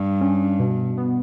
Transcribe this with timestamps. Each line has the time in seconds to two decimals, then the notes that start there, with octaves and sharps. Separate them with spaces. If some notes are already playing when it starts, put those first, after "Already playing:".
Already playing: G2
0.21 C#4
0.60 B2
0.98 B3